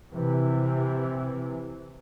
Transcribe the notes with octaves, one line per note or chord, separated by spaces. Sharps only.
C3 E3